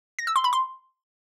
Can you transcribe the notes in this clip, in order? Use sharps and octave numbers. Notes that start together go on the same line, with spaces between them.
A#6
E6
C6
B5
C6